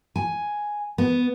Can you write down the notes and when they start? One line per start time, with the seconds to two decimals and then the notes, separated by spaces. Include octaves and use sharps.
0.16 G#5
0.98 B3